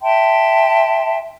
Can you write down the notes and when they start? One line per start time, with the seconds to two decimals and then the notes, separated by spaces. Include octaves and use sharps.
0.01 E5 G5 A5 C6